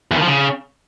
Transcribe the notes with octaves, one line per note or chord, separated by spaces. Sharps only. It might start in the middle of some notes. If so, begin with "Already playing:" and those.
E2
D#3
F3
C#3